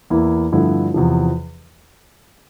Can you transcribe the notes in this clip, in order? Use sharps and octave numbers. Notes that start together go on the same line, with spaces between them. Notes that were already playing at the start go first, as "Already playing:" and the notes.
E2 E3 A#3 E4
G2 D3 F3 A3 E4
E2 C3 F3